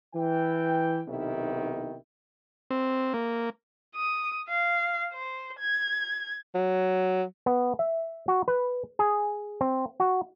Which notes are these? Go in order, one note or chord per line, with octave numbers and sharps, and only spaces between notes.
E3 G5
B1 C3 D#3 B3 E4 G5
C4
A#3
D#6
F5
C5
G#6
F#3
B3
E5
F#4
B4
G#4
C4
F#4